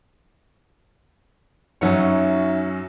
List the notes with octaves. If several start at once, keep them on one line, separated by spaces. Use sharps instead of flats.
F#2 F#3 C#4 D#4 E5 F#5